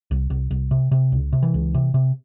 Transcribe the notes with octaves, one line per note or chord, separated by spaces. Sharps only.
C2
C2
C2
C3
C3
C#2
C3
E3
C#2
C3
C3